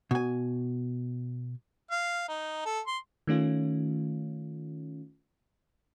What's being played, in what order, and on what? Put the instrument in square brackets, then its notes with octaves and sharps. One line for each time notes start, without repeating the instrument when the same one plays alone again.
[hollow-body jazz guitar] B2 G#5
[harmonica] F5
D#4
A4
C6
[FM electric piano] D#3 A3 C#4 F4